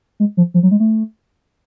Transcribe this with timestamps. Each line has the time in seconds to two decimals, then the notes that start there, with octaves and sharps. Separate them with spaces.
0.20 G#3
0.37 F3
0.54 F3
0.63 F#3
0.71 G#3
0.80 A3